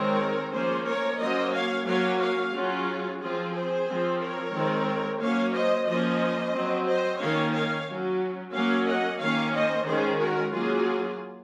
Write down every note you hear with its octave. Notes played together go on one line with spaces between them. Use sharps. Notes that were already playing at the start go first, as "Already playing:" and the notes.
Already playing: D#3 G#3 C4 A#4 C#5
F3 A#3 C#4 G#4 C5
A#4 C#5
F#3 A#3 C#4 C5 D#5
C#5 F5
F#3 A#3 C#4 C#5 F5
C#5 F5
F#3 C#4 F4 G#4
F3 C4 F4 G#4
G#4 C5
F3 C4
A#4 C#5
D#3 G#3 C4
F#3 A#3 C#4 C#5 F5
C5 D#5
F3 A#3 C#4 C5 D#5
F#3 C4
C5 D#5
D#3 A#3 C#4 C#5 F5
C#5 F5
F#3 C#4
F#3 A#3 C#4 C#5 F5
D#5 F#5
D#3 A#3 C#4 C#5 F5
C5 D#5
D#3 G#3 C#4 G#4 C5
F#4 A#4
F#3 A#3 C#4 F4 G#4